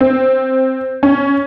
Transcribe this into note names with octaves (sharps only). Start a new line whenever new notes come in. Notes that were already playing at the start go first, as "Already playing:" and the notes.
C4
C#4